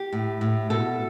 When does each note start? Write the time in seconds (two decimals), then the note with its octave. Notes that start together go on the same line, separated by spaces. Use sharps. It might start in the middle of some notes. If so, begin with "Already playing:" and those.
Already playing: G4
0.12 A2
0.41 A2
0.70 B2 A4